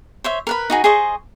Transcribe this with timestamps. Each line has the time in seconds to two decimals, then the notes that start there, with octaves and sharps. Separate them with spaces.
0.24 C5 C#5 E5
0.47 A#4 B4 B5
0.70 D#4 F#4 G#4
0.84 G#4 C5 D#5 C#6